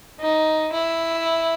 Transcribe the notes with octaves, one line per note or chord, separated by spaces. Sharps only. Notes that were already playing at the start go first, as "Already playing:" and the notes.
D#4
E4